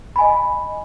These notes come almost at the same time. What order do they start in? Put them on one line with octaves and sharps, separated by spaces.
B5 G#5 D#5